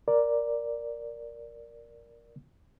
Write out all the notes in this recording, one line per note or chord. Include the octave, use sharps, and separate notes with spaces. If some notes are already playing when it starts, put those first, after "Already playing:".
A#4 D5